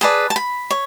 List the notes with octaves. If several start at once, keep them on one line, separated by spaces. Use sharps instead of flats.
G#4 B4 D5 A5
A5
B5
C#5